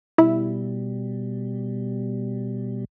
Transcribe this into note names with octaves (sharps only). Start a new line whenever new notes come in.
B2 G3 E4